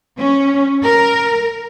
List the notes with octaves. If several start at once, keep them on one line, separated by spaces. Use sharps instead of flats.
C#4
A#4